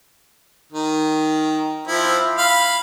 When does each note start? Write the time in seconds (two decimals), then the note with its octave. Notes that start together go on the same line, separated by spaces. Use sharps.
0.72 D#3
1.88 F3 C4 E4
2.38 F5 B5